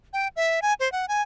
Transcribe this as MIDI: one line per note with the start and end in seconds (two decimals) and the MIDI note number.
0.13 0.28 79
0.36 0.60 76
0.62 0.74 80
0.80 0.91 72
0.92 1.08 78
1.08 1.22 80